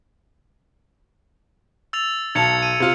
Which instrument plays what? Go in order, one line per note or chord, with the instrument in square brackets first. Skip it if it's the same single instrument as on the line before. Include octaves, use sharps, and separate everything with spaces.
[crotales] E6 A6 F7
[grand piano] B1 A5 [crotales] G#6 C#7 F7
[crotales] D#7
[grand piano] C3 F4